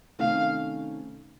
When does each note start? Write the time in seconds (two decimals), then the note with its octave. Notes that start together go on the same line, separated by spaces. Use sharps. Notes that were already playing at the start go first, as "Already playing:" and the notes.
0.19 C3 D#3 A3 C#4 F5